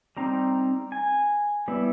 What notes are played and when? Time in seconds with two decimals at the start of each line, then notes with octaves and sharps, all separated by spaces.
0.17 G3 C4 D#4 A#5
0.92 G#5
1.68 G3 B3 E4